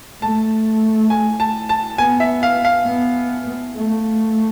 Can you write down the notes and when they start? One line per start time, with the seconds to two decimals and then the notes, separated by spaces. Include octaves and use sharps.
0.21 A3 A5
1.10 G#5
1.40 A5
1.69 A5
1.98 B3 G#5
2.20 E5
2.43 F5
2.65 F5
2.86 B3
3.75 A3